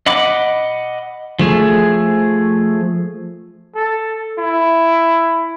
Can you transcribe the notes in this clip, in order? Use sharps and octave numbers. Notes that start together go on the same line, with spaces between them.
D#5 F#5 B5 D6
F3 A3 G#4
A4
E4